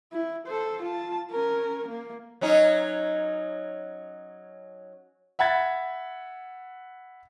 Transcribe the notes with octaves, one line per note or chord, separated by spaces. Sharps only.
E4
A4 C5
F4 A5
C#4 A#4
A#3
F#3 C#4 D#4
E5 F#5 B5 G#6 A6